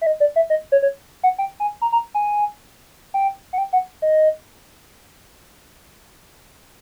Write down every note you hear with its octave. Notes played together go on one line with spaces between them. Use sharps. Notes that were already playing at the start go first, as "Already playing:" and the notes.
E5
D#5
D5
E5
D#5
C#5
C#5
F#5
G5
G#5
A#5
A#5
G#5
G5
F#5
G5
F#5
D#5